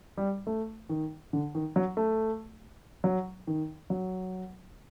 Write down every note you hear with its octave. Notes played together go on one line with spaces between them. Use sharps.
G3
A3
D#3
D3
D#3
F#3
A3
F#3
D#3
F#3